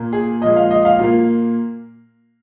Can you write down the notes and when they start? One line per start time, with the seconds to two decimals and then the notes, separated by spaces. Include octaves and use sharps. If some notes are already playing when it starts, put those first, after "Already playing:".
Already playing: A#2 A#3
0.13 G#4
0.41 A#2 F3 G#3 D#5
0.56 F5
0.71 D#5
0.85 F5
0.99 A#2 A#3 F4